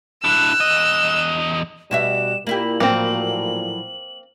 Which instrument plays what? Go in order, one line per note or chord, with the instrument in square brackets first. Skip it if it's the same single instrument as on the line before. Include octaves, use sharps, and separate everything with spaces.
[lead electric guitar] D4 E4 [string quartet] E6 F#6
[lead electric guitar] E2 D#5
[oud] B2 F#4 E5 [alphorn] G3 [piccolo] E7
[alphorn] A#2 [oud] A#3 E4 G4 [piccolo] F#7
[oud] A2 F3 F#3 [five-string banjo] A#3 C4